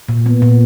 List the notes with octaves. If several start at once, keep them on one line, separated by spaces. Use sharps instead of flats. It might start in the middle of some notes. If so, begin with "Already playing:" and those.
A#2
B3
A#2